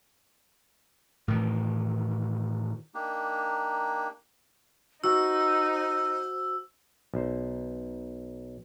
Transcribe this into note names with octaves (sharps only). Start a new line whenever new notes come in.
A2 D#3 E3
A#3 D4 D#4 G4
D#4 F#4 C5 F#5 E6
B1 C5